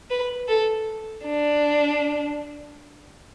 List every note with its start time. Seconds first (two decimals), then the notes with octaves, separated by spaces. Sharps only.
0.10 B4
0.48 A4
1.27 D4